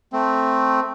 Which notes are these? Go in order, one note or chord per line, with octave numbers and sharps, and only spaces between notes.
A3 C4